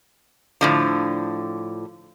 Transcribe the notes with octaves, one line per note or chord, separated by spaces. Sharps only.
A2 D3 F3